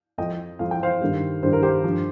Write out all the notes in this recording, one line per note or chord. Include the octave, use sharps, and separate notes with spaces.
F2 F3 D#5 G5
F2 F3 F5
G5
C5 F5
G2 D#3 G3
G2 D#3 G3 C5
A#4
G4 C5
G2 F3